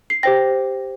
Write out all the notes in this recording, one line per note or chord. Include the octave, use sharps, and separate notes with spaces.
C7
G4 C5 G5 A#6